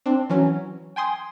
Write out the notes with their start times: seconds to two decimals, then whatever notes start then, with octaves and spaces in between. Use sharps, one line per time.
0.06 C4 D4
0.30 E3 F#3 C#4
0.96 G5 G#5 C6 D#6